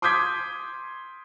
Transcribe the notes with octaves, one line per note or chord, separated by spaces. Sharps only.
C6 D6 D#6 G6 G#6 B6